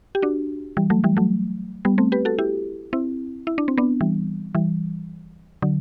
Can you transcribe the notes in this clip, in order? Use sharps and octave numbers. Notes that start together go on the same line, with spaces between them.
G4
D4 F#4
E3 G3
F#3 A3
E3 G3
F#3 A3
G3 B3
A3 C4
G4 B4
F#4 A4
E4 G4
C4 E4
E4
D4
C4
B3 D4
E3 G3
E3 G3
D3 F#3